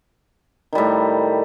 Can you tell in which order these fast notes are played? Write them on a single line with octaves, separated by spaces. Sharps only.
D#3 G3 A2